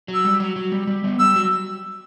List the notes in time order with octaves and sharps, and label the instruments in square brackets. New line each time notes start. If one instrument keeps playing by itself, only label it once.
[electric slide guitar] F#3
[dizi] E6
[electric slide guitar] G3
F#3
F#3
G3
G3
G3 B3
[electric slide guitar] G3 [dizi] E6
[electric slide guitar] F#3